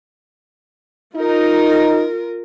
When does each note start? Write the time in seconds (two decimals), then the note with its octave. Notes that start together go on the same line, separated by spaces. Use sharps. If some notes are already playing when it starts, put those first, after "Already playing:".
1.15 D#4 F4 A#4